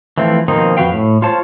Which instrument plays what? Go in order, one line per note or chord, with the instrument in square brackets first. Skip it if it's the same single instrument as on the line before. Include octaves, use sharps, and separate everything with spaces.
[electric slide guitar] E3 F3 A3 C4
B2 D#3 F3 A#3 C4 D#4
F2 F3 F#4 B4 F5 G5
A2
F4 C5 C#5 A5